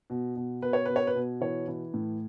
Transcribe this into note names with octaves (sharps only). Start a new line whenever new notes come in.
B2
B2
B2 B4
C#5
B2 B4
C#5
B4
B2
E3 C#5
E3
A2